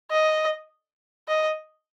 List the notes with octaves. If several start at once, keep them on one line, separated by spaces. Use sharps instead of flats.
D#5
D#5